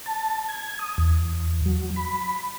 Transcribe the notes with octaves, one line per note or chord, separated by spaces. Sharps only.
A5
G#6
D#6
E2
F#3
B5